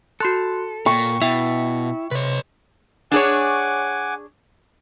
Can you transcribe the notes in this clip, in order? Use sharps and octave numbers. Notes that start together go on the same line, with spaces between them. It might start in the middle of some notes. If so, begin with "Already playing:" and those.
F#4 A4 C6 F#6
A#2 G5 C#6
B2 E4 E5 G5
C3 B4 C#5
D4 G#4 C#5 F#5 G#5 D6